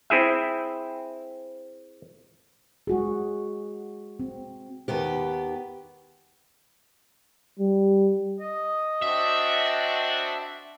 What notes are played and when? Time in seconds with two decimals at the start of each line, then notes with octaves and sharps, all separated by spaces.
0.10 C4 E4 G#4 E5
2.87 G#3 F#4 G#4
4.19 C4
4.88 D#2 D#3 B3 G4
7.59 G3
8.40 D#5
9.02 C4 D4 F#4 E5